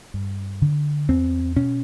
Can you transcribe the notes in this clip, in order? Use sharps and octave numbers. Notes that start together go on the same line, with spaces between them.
G2
D3
E2 C4
B2 C#4